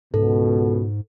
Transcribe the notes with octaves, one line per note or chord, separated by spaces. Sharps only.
C#2 G#2 B2 A4